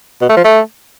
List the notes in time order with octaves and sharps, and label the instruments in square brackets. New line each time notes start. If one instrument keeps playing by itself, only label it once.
[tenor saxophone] B2
A3
F3
A3